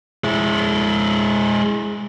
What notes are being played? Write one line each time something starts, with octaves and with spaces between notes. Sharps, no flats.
G#3 E4